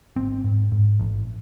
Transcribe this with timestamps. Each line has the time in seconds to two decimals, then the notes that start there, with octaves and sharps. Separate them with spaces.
0.16 G#1 C4
0.44 G#2
0.72 G#2
0.99 A1